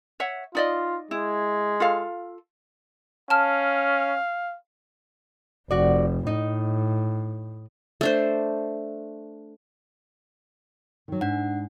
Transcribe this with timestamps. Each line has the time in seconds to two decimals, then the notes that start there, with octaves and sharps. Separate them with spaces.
0.20 C#5 E5 F#5
0.55 D#4 F4 D5 D#5
1.11 G#3 E4
1.80 F4 A4 F5
3.30 C#4 F5 A5 F6
5.71 F1 F#4 D5
6.27 A2 D#4
8.01 A3 D4 C5
11.08 D#3 F#3
11.21 G#2 D4 F#5